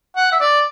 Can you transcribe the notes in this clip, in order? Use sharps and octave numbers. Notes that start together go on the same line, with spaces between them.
F#5
E5
D5